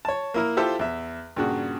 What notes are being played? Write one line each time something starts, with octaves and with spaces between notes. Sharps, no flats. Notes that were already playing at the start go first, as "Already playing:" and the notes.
C#5 A5
A#3 E4 A#4
E4 F4 G4 A4 C5 E5
E2 E5
G2 A#2 C#3 F#4